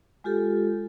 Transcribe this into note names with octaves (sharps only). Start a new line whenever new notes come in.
G#3 F4 G4 A4